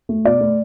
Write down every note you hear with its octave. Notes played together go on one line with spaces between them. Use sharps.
A3
B2 D5
A3